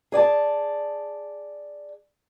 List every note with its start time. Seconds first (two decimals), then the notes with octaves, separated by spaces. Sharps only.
0.12 G#4 D5 G#5 A5